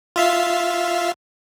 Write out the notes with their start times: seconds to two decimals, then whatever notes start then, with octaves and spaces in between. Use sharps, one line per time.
0.16 F4 E5 F5